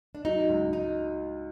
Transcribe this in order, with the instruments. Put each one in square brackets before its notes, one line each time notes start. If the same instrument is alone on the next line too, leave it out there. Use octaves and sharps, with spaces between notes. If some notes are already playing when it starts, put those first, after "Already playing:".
[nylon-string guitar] D4
[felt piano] F#3 [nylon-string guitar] D#4
[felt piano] C#2
[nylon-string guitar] D#4